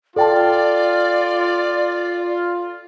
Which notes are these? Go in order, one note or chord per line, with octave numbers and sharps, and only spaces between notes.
F4 A4 D5 G5 A5